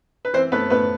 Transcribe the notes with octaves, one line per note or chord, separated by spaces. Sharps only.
B4
E3 C4 C5
A3 B3 B4
A2 B3 B4